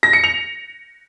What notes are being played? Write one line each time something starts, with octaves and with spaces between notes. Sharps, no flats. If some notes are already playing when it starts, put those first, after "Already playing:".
A#6
C#7
F7